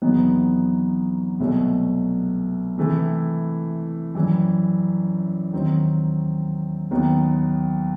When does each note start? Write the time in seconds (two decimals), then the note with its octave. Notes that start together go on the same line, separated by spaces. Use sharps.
0.02 E2 C3 F#3 B3 D#4
1.39 C2 B2 F#3 A3
2.78 C3 E3 A3 E4
4.15 F#2 E3 G3
5.53 D#2 D#3 F#3 C4
6.91 D#2 D#3 F#3 B3 D#4